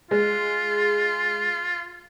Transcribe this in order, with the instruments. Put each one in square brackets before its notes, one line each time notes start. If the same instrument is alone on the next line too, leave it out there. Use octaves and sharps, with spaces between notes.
[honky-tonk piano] G#3 [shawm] F4